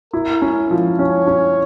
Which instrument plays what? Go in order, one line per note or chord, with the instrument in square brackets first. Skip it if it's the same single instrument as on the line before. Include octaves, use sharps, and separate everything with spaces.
[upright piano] E4 [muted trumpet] A#4
[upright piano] C#4
F3
[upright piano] C#4 [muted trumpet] C#5
[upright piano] C#4